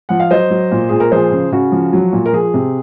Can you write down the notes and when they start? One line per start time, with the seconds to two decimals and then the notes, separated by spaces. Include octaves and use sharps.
0.09 F3 F#5
0.20 F5
0.30 F#3 C5 D#5
0.50 F#3
0.72 A#2
0.89 A#2 G#4
1.00 A#4
1.12 F3 G#4 C5
1.32 C#3
1.52 C#3 F#4
1.72 F3
1.93 F#3
2.13 A#2
2.26 A#4
2.33 F3 G#4
2.54 C3